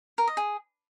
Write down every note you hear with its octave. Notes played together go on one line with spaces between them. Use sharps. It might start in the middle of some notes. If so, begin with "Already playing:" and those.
A#4
D#5
G#4